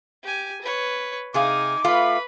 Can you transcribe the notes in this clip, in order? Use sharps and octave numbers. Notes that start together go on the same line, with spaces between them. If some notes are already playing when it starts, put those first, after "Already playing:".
G4 G#5
B4 C#5
C3 D#4 G#4 F5 G#5 D6
A3 F4 B4 F5 B5